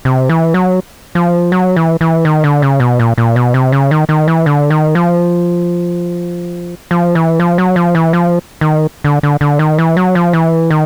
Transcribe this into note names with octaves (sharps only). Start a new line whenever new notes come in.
C3
E3
F#3
F3
F#3
E3
E3
D#3
D3
C#3
B2
A#2
A#2
B2
C3
C#3
D#3
D#3
E3
D3
D#3
F3
F3
E3
F3
F#3
F3
E3
F3
D#3
D3
D3
D3
D#3
E3
F#3
F3
E3
D#3